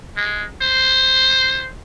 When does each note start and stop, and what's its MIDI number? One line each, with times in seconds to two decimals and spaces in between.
0.16 0.44 56
0.62 1.70 72